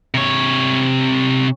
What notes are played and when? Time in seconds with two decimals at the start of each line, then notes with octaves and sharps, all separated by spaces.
0.14 C3 C#5